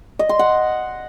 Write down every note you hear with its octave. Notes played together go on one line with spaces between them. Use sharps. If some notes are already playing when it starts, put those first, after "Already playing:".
D#5
C6
F#5